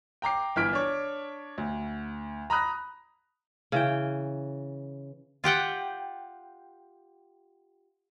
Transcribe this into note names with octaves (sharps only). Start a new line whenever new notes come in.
G5 A#5 D6 C7
G1 E3 F6 B6 D7
D4 C#5
D2
A#5 B5 D#6 F#6 A#6
C#3 E3 G5
F4 G4 F#5 G5